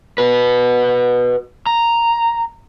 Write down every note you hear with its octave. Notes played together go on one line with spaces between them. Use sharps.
F#4 B4
A#5